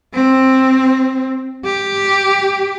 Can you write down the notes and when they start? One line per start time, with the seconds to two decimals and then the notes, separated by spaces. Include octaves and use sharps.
0.14 C4
1.65 G4